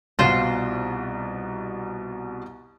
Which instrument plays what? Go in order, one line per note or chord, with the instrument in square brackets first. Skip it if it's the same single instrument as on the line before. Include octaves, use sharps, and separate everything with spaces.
[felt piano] C2 B2 F#5 [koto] F4 C5